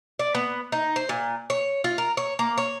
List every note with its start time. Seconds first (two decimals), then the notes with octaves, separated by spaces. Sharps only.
0.19 D5
0.35 B3
0.72 D#4
0.96 C5
1.09 A#2
1.50 C#5
1.84 F4
1.98 A#4
2.17 C#5
2.39 A#3
2.58 C#5